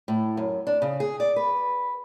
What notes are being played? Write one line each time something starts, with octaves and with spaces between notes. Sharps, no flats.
A2
F#2
D4
C#3
G#4
D5
B4